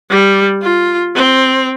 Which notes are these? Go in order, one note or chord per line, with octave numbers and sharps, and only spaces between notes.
G3
F4
C4